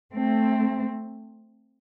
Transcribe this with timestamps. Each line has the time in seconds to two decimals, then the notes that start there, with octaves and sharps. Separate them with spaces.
0.13 A3 C4